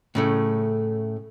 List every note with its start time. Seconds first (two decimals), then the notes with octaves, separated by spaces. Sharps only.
0.15 A2 C#3 A3